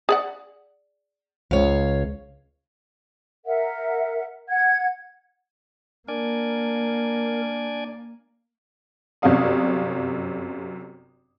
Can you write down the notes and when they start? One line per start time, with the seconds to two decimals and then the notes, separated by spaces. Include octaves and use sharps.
0.09 G#4 D5 F#5
1.51 C#2 C#5 F5
3.46 A#4 E5 F#5
4.49 F#5 G#6
6.08 A#3 D4 A#4 D5 G#5
9.22 G1 F#2 C3 C#4 F5 D#6